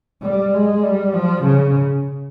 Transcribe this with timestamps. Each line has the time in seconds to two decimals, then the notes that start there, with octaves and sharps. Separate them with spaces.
0.23 G3
0.54 G#3
0.83 G3
1.14 F3
1.44 C#3